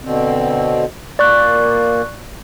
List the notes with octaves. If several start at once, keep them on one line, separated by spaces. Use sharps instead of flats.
B2 D3 C4
A#2 A#3 D5 C#6 F#6